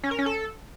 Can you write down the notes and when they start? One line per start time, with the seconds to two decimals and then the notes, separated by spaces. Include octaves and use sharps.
0.04 C#4
0.11 A#4
0.19 C#4
0.26 A4